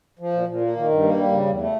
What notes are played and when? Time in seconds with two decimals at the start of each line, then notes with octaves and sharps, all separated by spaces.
0.19 F3
0.33 A#2
0.48 A#2
0.61 A#3
0.76 D#3
0.90 G2
1.03 A#3
1.17 G3
1.31 C#3
1.45 E2
1.60 A3